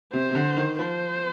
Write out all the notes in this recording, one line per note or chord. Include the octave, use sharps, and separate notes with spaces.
C3 C5
C3
D3
D#3
F3 C5